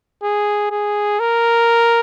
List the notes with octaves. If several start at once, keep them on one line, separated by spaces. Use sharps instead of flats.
G#4
G#4
A#4